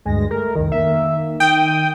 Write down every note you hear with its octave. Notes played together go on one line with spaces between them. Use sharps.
D2 G2 G#3 A#6
A3 A#4
C2 F2 D#3
D#3 A#3 E5
D#3 G5 D#6